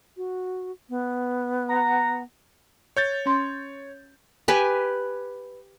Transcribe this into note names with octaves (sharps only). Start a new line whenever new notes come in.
F#4
B3
F#5 A#5
C#5 G6 A6
C#4 C6
G4 B4 G#5